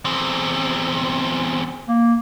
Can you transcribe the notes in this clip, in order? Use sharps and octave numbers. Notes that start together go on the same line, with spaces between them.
E2 C4
A#3